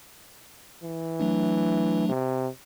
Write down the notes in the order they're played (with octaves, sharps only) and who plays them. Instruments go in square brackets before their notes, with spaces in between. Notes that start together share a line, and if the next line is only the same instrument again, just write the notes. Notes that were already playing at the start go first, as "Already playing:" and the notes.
[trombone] E3
[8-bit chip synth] F#3 A3 D4
[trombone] C3